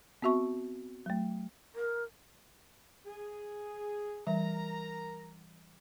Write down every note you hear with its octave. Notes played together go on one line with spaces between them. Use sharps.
B3 C4 F#4 E5 C#6
F#3 A3
A#4
G#4
E3 G3 A#4 E5 A#5